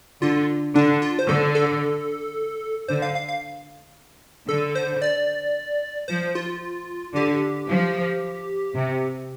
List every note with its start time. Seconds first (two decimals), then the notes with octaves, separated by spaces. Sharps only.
0.22 D3 F4
0.75 D3 D4
1.02 F4
1.19 C5
1.28 D3 A4
1.55 A4
2.88 D3 C5
3.02 F5
3.15 F5
3.29 F5
4.48 D3 A4
4.75 C5
5.02 D5
6.08 F3 C5
6.35 F4
7.15 D3 G4
7.69 F3
8.75 C3